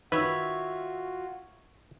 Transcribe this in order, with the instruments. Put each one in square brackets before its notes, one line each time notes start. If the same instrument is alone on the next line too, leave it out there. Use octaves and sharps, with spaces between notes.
[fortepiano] D#3 E6 [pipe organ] F4 F#4 [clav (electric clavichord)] B4 [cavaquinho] C#5 E5